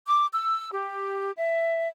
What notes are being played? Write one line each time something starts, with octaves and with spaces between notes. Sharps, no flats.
D6
E6
G4
E5